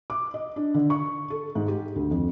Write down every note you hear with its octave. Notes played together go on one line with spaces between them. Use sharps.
D6
D#5
D4
D3
C#6
A4
G#2
G4
D2
F2